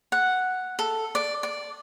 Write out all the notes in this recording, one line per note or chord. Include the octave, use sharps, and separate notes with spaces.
F#5
A4
D5
D5